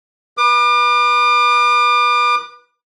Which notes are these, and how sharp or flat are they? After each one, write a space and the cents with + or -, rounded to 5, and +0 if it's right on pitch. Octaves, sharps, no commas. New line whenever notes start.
B4 -20 D6 +40